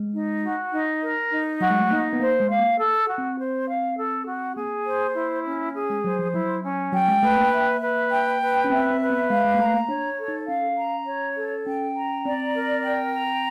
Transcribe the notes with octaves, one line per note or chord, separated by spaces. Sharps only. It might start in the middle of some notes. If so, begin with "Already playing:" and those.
Already playing: G#3
D#4
F#4
D#4
A#4
D#4
F#3 F#4
G#3
A3
A#3 D#4
B3
A#3 C5
G#3
F5
A#3
A4
F#4
C4
C5
F5
A4
F#4
A#3 G#4
C5
E4
C#4
G#4
G#3
F#3 C5
F3
F#3 E4
C#4
F#3 G5
G#3
A3 B4
A#3
E5
B4
G5
B4
C#4
C4 E5
C4
B4
B3
G#3 F5
G#3
A#3
A3 A#5
A#3
D4 C#5
A4
D#4
C#4 F5
A#5
C#5
A4
C#4 G5
A#5
C4 D5
A#4
G5
A#5